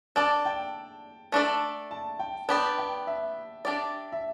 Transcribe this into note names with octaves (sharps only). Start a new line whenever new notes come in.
D4 A4 D5 A5
G5
A3 D4 A4 D5
A5
G5
B3 D4 G4 D5 A5
G5
E5
D4 G4 D5
E5